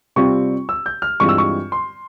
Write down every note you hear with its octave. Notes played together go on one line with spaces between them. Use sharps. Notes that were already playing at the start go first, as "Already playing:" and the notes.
C3 G3 C4 F4 C#6
E6
G6
F6
G2 E3 G#3 C4 F4 C#6
E6
C#6
C6